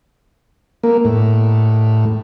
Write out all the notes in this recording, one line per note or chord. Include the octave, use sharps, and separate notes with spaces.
A#3
A2